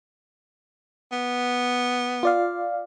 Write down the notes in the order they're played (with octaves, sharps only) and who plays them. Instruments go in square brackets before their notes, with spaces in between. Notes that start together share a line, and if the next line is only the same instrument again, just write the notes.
[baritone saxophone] B3
[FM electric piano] F4 D5 F5